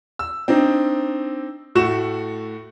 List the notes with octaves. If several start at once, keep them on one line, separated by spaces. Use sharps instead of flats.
E6
C4 D4 D#4
A2 A3 F#4 C#6 E7